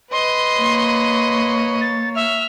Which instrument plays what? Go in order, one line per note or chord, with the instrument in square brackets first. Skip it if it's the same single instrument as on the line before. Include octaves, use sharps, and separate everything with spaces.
[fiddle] B4 D#5 [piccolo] C6
[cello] A#3 C#5
[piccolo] C6
A6
[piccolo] E5 [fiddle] F6